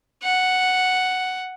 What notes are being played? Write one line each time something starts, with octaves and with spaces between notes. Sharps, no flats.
F#5